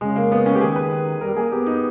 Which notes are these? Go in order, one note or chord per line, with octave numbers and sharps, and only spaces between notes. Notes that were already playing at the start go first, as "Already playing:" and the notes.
C#3 G#3
A#3
B3
C#4
G4
D#3 G#4
B4
G3 A#4
A#3 G#4
B3 G4
D#4